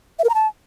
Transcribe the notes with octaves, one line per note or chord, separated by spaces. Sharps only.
E5
A#4
A#5
A5